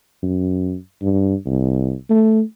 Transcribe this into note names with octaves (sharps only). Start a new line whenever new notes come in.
F#2
G2
C2
A3